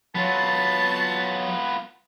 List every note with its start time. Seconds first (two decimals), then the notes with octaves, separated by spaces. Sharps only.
0.15 F#3 B3 F4 A5